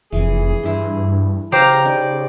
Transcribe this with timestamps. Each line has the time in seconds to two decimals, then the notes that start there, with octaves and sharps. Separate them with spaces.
0.12 F1 E3 G#4
0.63 G2 E4 C6
1.52 C#3 G4 C5 F5 A#5
1.85 D#4 D5